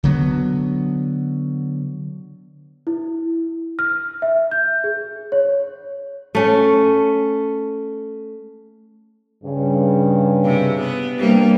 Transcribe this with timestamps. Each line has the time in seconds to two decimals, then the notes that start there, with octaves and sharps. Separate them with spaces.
0.03 D3 F#3 B3
2.87 E4
3.79 F6
4.22 E5
4.51 G6
4.84 G#4
5.32 C#5
6.35 A3 C#4
9.44 G2 C#3
10.45 C3
10.81 B3
11.18 C3 G3 A#3 C4 D4